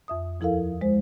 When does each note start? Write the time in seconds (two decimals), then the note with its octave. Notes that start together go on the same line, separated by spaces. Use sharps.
0.08 F2 E5 D#6
0.40 D#2 F3 E4 A4 A#4 F5
0.81 G#3 C5